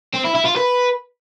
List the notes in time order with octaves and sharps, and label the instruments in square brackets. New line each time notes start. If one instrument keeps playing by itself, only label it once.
[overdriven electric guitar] C4
E4
E4
F4
B4